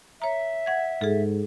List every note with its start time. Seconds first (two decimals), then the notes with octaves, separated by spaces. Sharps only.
0.22 C#5 E5 A#5
0.66 F#5 G#6
1.01 G#2 G#4 A4